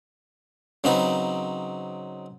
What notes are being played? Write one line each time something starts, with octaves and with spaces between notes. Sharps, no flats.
C#3 F#3 C4 D#4 B4